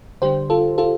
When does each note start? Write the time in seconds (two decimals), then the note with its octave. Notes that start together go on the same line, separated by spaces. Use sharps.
0.22 D3 G3 D4 G4 C5
0.50 F4 A4
0.78 F4 A4